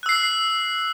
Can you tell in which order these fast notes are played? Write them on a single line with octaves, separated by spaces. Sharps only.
F#6 E6 C7